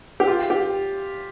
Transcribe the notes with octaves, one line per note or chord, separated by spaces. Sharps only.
G4
F4
G4